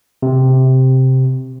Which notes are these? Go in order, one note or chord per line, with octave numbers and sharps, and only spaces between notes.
C3